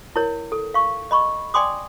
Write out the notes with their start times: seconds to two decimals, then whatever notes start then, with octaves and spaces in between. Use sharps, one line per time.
0.16 E4 A#4 C#5
0.52 A4
0.74 F5 C#6
1.11 D#5 B5 C#6
1.54 D5 G5 G#5 C6 D6 D#6